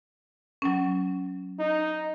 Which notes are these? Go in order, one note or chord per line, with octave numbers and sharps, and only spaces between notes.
F#3 C#4
D#4